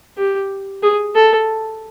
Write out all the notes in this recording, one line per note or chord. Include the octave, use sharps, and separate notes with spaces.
G4
G#4
A4